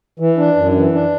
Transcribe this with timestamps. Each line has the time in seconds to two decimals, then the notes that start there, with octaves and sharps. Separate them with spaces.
0.19 E3
0.38 D4
0.56 F#2
0.75 E3
0.93 D4